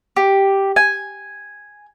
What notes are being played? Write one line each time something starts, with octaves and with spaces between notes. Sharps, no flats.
G4
G#5